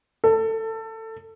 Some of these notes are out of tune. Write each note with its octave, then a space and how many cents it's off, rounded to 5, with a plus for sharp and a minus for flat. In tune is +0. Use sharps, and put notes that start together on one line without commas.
A4 +20